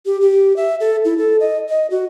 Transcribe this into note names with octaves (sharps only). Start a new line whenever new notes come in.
G4
G4
E5
A4
E4
A4
D#5
D#5
F#4